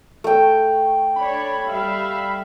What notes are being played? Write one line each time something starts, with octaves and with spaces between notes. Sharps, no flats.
A3 G5
D4 C#5 D5 B5
G3 E5 F5